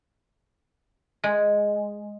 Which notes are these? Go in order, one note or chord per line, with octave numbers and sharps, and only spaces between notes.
G#3